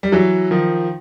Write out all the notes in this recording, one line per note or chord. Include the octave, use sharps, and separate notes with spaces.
G3
E3 F#3
D#3 F3